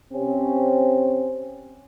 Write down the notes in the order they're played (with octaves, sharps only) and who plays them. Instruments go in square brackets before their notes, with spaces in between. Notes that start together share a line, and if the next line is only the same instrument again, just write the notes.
[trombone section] C3 C4 C#4